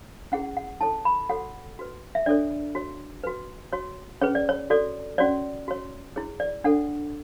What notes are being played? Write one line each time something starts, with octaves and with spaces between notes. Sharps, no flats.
C#4 E4 G#4 F#5
F#5
E4 A4 C#5 A5
B5
F#4 A4 C#5 F#5
F#4 B4
E5
D4 A4 C#5 D5
F#4 C#5
F#4 B4
F#4 C#5
C#4 G#4 B4 C#5
D5
C#5
F#4 A4 C#5 D5
C#4 F#4 C#5 D5
F#4 C#5
E4 G#4 C#5
D5
D4 A4 C#5 F#5